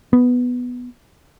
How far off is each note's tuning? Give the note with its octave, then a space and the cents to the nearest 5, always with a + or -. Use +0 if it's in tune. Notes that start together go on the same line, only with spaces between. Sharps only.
B3 +0